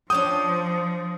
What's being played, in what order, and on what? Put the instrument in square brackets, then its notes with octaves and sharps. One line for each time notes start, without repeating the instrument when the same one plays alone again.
[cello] F3 [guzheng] D4 C#5 G5 [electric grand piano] D#6